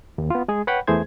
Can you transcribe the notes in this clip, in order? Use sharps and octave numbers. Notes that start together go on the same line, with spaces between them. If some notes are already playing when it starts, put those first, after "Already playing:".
D#2
B3 F4
G#3 G#4
B4 C#5 F#5 G5 B5
E2 E3 A3 G#4 C5 G#6